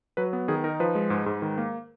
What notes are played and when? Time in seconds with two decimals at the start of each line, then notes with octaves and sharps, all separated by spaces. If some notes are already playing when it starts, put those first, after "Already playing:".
0.17 F#3 B4
0.33 B3
0.48 D#3 G#4
0.64 D#4 A#4
0.80 F3 B4
0.95 G#3
1.10 G#2
1.26 G#2
1.42 D#3
1.58 A#3